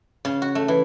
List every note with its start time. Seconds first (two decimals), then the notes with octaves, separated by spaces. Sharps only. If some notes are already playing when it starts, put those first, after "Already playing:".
0.25 C#3
0.42 F#4
0.55 A3
0.68 E3